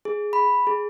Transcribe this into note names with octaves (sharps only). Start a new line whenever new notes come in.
G#4
B5
G#4